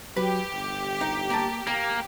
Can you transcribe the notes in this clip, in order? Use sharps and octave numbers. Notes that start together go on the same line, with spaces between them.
F#3 G4 B4
G1
D#4
A#3 A5
A#3 A#5